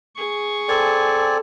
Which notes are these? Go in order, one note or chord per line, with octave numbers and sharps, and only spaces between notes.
G#4 C#6
C4 A4 D5 G#5